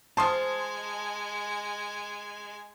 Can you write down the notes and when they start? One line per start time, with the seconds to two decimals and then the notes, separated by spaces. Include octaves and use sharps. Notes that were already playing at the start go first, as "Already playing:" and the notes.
0.17 G#3 F4 C5 G#5 A5 C6 D#6